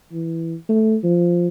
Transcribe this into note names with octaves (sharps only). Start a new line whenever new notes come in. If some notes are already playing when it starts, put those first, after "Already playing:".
E3
A3
F3